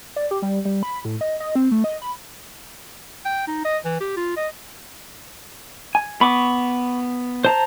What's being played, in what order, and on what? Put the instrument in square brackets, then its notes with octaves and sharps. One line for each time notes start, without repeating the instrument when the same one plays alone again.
[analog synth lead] D5
G4
G3
G3
B5
A2
D#5
D#5
C4
A3
D#5
B5
[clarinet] G5
D#4
D#5
E3
G4
F4
D#5
[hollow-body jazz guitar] G#5
[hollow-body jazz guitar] B3 [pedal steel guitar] B5 C#6 D6
[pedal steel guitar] C5 A5 A#5